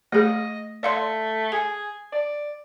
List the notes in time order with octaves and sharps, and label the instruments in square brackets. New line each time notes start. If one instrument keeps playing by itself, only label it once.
[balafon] A3 G#4 [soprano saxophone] D#5
[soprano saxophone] A3 [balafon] D5 F5 C6
[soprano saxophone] G#4 [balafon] G#5
[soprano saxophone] D5